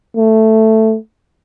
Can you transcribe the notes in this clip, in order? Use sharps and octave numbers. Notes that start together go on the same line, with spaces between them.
A3